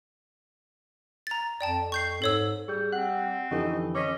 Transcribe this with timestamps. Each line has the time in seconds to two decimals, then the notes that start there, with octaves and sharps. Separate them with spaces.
1.27 A#5 A6
1.61 F2 D5 G5 A5
1.92 C#6 G6 C7
2.22 G#2 A4 C#5 E6
2.68 G3 G#4 G6
2.92 C4 F#5 F#6
3.51 F2 D3 E3 D#4 G4
3.95 C#4 D#5 D6 B6